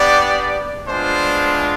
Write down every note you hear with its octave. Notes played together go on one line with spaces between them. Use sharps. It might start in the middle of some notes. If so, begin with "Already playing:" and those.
Already playing: B3 D4 G4 D5
G#3 B3 D4 F4 C5